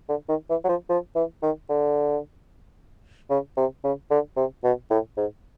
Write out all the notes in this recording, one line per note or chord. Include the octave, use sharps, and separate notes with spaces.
D3
D#3
E3
F#3
F3
F3
E3
D#3
D3
C#3
C3
C#3
D3
C3
B2
A2
G#2